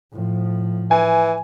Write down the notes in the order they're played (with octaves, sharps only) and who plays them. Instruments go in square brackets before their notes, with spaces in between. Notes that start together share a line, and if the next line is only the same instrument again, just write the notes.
[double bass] A2 F3
[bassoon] E3 [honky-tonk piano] G#5